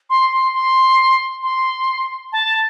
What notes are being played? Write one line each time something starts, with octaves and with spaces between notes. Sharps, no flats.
C6
C6
C6
C6
A5